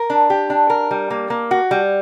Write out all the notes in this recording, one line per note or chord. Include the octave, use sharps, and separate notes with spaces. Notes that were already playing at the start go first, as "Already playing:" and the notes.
Already playing: A#4
D4
G4
D4
A#4
G3
A#3
A#3
F#4
G3